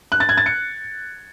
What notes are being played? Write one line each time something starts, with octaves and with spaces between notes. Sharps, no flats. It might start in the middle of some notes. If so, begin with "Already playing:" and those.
F#6
A6
G#6
A6
C#7